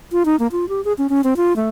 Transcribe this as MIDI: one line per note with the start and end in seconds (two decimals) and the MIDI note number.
0.12 0.25 65
0.26 0.36 63
0.39 0.47 58
0.52 0.68 65
0.69 0.83 67
0.85 0.93 68
0.98 1.07 61
1.09 1.21 61
1.24 1.34 60
1.37 1.56 65
1.56 1.69 57